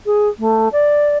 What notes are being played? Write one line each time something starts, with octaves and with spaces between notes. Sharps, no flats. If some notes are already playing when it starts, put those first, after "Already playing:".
G#4
A3
D5